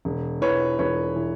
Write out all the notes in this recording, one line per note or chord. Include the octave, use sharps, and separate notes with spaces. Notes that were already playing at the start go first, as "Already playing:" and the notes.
E1
E3 B4 C#5
E1 B4 C#5
E3